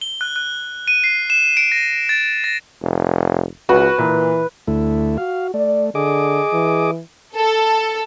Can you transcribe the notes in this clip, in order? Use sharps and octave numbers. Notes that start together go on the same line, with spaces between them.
G7
F#6
F#6
D#7
C7
E7
D7
A#6
A6
A#6
F1
C#2 F#4 B4
A#2 E3
D2 A3 E4
F#4 F5
A3 D5
D3 G#4 D#5 D6
E3
A4